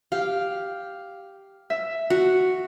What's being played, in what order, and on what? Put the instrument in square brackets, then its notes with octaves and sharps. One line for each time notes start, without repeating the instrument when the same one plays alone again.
[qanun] G4 [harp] F5
[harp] E5
[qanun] F#4